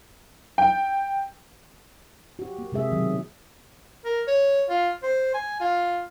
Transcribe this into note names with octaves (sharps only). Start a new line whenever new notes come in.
G5
F#4 G4
A#3
C3 G#3 G#4 E5
B2 D#3 F#3
A#4
C#5
F4
C5
G#5
F4